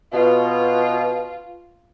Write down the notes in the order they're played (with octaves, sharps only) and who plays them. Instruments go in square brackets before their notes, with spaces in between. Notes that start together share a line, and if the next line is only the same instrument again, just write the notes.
[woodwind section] B2 [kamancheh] F4